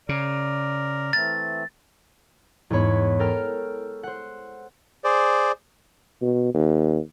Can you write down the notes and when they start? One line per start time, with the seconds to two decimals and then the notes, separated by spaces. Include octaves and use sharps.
0.09 C#3 A#4 D5
1.13 E3 A3 C4 A6
2.70 E2 G#2 B3 C#5 B5
3.19 A4 A#4 G5 F6
4.03 C5 F#5
5.04 G#4 C5 D5
6.22 B2
6.54 D#2